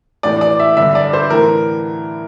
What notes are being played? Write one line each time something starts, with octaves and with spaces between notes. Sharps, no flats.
A2 E3 D5
D5
E5
G2 D3 E5
D5
C5
A2 E3 A#4